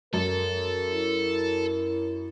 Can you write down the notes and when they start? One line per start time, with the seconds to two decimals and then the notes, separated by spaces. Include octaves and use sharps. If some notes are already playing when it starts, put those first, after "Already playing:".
0.13 F#2 A4 A#4
0.91 E4